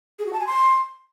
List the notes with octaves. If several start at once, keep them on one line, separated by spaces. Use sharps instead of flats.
G#4
F#4
A5
G#5
C6